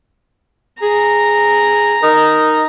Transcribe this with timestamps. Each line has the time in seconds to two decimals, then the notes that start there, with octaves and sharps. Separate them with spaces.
0.82 G#4 A#5
2.03 D#4 A#4